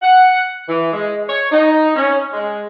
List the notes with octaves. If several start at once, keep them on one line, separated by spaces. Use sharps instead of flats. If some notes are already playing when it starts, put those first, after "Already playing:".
F#5
E3
G#3
C#5
D#4
C#4
G#3